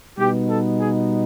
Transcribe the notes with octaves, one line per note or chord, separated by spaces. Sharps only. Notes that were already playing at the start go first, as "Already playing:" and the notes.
B2 G3 B3 D#4 G4
A4
G#4